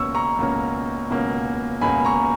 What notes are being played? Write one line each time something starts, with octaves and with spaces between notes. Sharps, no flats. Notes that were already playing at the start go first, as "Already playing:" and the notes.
Already playing: C#2 B2 A#3 C#4 C#6 E6
A#5 C#6
C#2 B2 A#3 C#4
C#2 B2 A#3 C#4
C#2 B2 A#3 C#4 G#5 B5
A#5 C#6